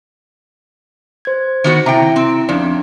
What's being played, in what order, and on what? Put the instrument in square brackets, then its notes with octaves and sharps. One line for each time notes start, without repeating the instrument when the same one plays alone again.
[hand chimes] C5 G#6
[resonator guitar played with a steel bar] D#3 B3 F#4
[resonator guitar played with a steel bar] C3 G5 [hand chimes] E4 E5 A#5
[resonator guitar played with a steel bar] C4
[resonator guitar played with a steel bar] F2 [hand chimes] C#4 D4 D5